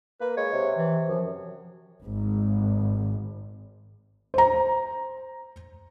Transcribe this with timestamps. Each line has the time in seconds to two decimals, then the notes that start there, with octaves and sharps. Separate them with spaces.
0.21 A#3 B4
0.37 G#3 C#5
0.53 C3
0.77 E3
1.09 F#2 F3
2.04 G#1
4.34 C5 A#5